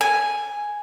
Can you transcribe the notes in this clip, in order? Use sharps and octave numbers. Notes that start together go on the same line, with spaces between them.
G#5